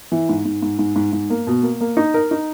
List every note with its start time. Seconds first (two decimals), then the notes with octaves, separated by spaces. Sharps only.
0.12 E3
0.29 G#2
0.45 G#2
0.62 G#2
0.79 G#2
0.96 G#2
1.13 G#2
1.30 A#3
1.47 B2
1.63 A#3
1.81 A#3
1.97 D#4
2.14 A#4
2.31 D#4